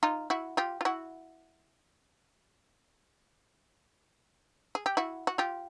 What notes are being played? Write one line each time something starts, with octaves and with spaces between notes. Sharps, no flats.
D#4 F4
E4 F#4
F4 G4
F4
E4 F#4
G#4
G4
E4 F#4
F#4
F4 G4